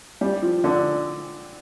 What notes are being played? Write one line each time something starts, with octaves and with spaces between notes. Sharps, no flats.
G3
F3
D3